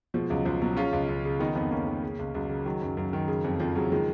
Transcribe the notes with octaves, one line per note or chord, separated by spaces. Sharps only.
B2 F3 G#3
C#2 F#3
C#2 F3
B2 F#3
C#3 C#4 F4
C#2
C#2
C#3
D#3 B3 D#4
F2 B3 D#4
F2 A#3 C#4
D#3
C#3
C#2
C#2 F#3
C#3
D#3 F#3
F#2
F#2
D#3
C#3
F2
F2 F3
C#3 F#3
D#3 F3 G#3